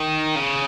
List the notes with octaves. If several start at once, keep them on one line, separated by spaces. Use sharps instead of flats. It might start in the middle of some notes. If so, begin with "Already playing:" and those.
Already playing: D#3
C#3